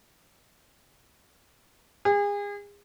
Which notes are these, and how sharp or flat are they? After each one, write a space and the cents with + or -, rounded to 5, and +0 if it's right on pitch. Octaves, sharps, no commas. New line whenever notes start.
G#4 -35